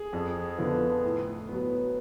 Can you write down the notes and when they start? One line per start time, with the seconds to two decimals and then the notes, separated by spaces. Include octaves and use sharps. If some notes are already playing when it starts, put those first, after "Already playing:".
Already playing: G#4
0.13 F2
0.58 D3 F3 B3
1.03 A2
1.49 F#3 B3